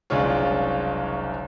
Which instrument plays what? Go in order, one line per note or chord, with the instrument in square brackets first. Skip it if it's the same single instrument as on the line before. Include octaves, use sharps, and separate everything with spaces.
[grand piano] F#1 C2 G#3 D4 F4 C#5